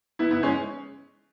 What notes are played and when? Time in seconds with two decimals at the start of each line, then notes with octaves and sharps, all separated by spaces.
0.19 B3 E4
0.31 B3 E4
0.43 G#3 C#4